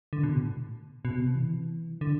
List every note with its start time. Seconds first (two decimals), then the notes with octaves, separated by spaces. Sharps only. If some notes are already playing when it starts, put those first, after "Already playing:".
0.13 D3
0.23 B2
0.35 A2
1.05 B2
1.20 C3
1.35 E3
2.01 D3